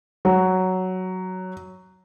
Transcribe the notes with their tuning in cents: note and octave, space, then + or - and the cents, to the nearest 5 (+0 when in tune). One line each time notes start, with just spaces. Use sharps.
F#3 +5